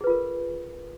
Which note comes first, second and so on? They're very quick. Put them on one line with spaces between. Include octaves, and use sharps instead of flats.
G#4 B4 F4 A#4